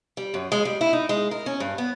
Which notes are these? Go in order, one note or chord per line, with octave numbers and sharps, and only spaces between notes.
G3
F#2
G#3
G3
E4
D#4
G#3
A#4
C#4
G2
B3